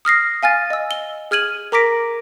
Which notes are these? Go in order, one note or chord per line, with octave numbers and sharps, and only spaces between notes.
D#6 F6 A#6 C7
F5 G#5 F6 A6
D#5 E6
G7
G#4 F6 G#6 D#7 F#7
A#4 A#5 D6 A#6 B6 D7